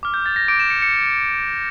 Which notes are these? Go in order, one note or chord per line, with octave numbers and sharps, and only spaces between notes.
D6 F6
G6
A6
A#6
D6 G6 D7
E7
C#7
C#7